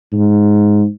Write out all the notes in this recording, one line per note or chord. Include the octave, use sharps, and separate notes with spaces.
G#2